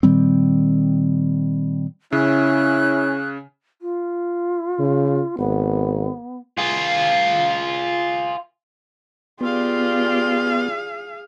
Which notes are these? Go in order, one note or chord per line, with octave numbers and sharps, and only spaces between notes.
A#2 D#3 G3 C4
C#3 C#4 E4 F#6
F4
C#3
G#1 B3
F4 G#4
B3 F4 G4 G#4 D5 F5